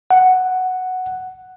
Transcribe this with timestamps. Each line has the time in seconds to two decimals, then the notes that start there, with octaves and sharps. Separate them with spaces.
0.11 F#5